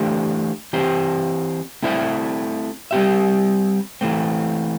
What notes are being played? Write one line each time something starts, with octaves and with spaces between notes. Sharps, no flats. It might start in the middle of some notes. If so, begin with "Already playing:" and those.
Already playing: E3 A3 D4 G4 C5
E3 C4 G4 C5
A3 C4 E4 C5 E5
G3 C4 G4 E5
E3 A3 C4